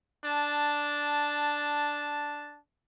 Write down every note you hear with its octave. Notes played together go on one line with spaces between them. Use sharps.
D4 A5